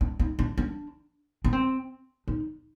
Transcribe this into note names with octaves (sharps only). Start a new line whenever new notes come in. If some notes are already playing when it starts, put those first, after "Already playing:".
D4
D#4
D4
D4
D4
C4
D#4